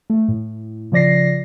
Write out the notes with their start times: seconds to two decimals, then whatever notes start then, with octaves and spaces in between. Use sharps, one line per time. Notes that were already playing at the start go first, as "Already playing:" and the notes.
0.10 A3
0.29 A2
0.92 C#3 F3 D5 A#6 C7